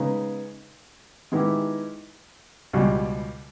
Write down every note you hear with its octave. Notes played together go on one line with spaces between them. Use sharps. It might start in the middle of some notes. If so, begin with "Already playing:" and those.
Already playing: C#3 G#3 B3 D#4
D#3 G#3 B3 E4 G4
C#2 B2 G3